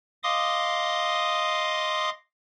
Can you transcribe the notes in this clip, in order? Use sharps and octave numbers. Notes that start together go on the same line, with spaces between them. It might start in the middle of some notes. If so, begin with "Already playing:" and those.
D#5 F5 C6 D6 D#6